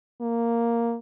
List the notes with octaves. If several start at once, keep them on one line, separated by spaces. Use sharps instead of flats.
A#3